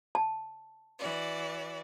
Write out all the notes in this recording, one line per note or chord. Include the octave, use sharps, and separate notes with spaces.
A5
E3 F#4 D5